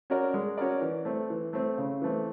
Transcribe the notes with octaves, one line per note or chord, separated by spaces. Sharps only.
C#4 F#4 A#4 D5
G#3
C#4 F#4 A#4 D5
E3
A3 C4
E3
A3 C4
C#3
E3 A3 C4